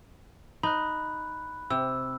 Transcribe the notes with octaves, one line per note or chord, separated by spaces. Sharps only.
D#4 B5 F#6
C3 E6